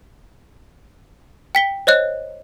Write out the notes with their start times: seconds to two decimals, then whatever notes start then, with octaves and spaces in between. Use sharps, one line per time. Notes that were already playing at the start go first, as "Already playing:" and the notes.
1.55 G5 B6 G7
1.87 C5 C#5 D#5 F#6